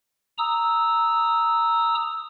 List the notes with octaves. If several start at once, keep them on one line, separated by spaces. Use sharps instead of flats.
A#5 D#6 E6